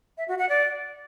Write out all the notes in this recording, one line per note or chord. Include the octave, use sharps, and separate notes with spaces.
E5
F#4
F#5
D5